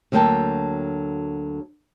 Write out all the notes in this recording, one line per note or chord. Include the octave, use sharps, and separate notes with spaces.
D2 D3 F#3 A#3 G5 A5